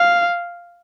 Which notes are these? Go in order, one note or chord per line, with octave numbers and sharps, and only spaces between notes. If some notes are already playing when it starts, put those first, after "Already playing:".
Already playing: F5